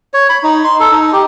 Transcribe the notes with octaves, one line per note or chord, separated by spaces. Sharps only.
C#5
B5
D#4
C6
A4
D#4
G4